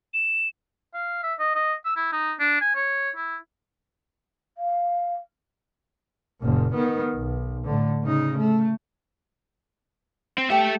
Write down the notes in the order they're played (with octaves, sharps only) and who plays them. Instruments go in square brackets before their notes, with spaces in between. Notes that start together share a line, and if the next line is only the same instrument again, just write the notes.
[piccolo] E7
[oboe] F5
E5
D#5
D#5
E6
E4
D#4
D4
G#5
C#5
E4
[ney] F5
[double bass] F#1 A#2
D#3 B3
B1
A2 D3
C#3 D#4
A3
[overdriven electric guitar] C4
[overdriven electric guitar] A3 E5 [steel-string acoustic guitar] G4 G5